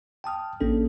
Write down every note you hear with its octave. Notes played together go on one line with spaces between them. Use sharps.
G5 A5 D#6 F6
A1 A#3 C#4 D4 A4